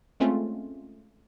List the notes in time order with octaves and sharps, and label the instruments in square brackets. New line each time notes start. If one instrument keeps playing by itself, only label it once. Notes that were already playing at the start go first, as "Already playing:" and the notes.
[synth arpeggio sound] G#3 A3 C4 C#4 F4